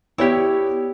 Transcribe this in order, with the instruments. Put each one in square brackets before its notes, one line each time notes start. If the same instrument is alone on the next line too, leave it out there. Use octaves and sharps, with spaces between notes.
[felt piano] B3 C#5 D5 [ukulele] E4 G4